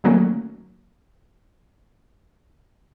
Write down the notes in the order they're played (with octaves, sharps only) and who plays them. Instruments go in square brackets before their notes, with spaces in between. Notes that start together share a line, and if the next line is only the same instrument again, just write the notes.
[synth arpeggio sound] D3 D#3 F#3 A3 A#3 C#4